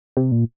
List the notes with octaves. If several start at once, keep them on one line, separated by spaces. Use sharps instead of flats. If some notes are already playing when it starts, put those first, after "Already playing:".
C3
A#2